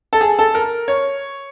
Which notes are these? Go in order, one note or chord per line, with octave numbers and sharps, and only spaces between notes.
A4
G#4
A4
A#4
C#5